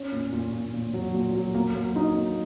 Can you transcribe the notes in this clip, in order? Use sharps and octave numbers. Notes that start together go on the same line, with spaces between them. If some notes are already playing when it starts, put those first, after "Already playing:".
Already playing: C#4
A#2
A#2
A#2
A#2
F#3
A#2
F#3
A#3
F#3
D#4
A#3